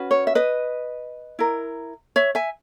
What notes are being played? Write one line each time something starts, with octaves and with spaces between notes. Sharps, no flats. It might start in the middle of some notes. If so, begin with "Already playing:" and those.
Already playing: C#4 F#4 B4
C#5
E5
B4 D#5
E4 A#4
C#5 E5
E5 G#5